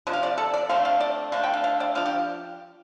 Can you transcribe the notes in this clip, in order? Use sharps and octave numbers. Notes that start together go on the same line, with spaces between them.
C3 F3 D4
F5
D5
A4
D5
D3 A3 C4 F5
F5
D5
D3 A3 D4 F5
G5
F5
F5
D5
F3 D4 F5
G4